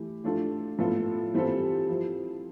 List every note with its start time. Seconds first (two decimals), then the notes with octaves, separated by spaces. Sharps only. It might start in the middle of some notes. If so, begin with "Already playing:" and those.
Already playing: E3 A3 E4 G4
0.24 F3 A3 D4 F4 A4
0.79 A2 F3 B3 F4 A4
1.34 E3 G3 C4 F4 A4
1.89 F3 C4 E4